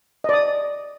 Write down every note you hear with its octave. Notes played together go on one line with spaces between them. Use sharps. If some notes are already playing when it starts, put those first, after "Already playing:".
D5 D#5 D#6